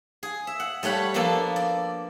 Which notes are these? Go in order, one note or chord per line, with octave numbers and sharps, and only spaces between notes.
G#4
E5
F#5
G3 A3 C#5 F#5 B5
F3 A#3 B3 D4 A4
D5